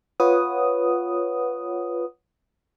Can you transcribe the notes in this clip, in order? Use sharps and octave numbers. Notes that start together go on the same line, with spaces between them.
F4 B4 C#5 F#5 D#6